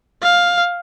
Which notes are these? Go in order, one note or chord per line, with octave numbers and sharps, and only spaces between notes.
F5